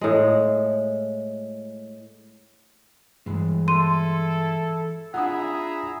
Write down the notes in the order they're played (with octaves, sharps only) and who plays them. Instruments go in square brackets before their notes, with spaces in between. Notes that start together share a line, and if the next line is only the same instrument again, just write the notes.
[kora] A2 G#3
[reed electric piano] G2 [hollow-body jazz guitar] E3 G#3
[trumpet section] E4 A4 [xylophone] C6 D#7
[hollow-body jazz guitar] D4 E4 F4 [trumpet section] G#4 E5 A#5 [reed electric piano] F#5 D#6